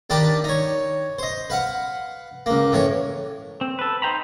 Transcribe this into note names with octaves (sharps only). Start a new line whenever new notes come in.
D#2 D4 D#4 G4 A5 B5
D#4 C#5
C5 D#5
B4 F5 F#5
C#2 A#3
A2 E3 C#5
C4
A4 B4
D#4 C5 G5 A#5 B5